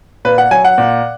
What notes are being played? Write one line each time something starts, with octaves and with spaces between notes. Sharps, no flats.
A#2 B4
F#5
F#3 G#5
F#5
A#2